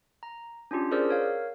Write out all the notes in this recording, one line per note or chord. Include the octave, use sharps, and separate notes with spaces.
A#5
C#4 D4 F4 G4
G#4 A#4 C5 D5 E6
A#4 C#5 F5